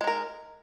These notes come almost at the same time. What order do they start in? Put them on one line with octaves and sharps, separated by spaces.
G#3 D#4 A#4